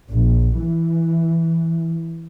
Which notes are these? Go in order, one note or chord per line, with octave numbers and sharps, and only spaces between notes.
A#1
E3